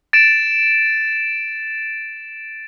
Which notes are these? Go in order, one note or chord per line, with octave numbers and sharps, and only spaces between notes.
A6 D7 E7